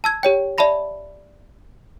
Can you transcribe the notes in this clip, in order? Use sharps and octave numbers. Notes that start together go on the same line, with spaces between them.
A5 E6 G#6
G4 C#5 G5
D5 E5 A5 B5 A#6